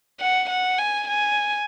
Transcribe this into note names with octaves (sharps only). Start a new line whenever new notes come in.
F#5
F#5
G#5
G#5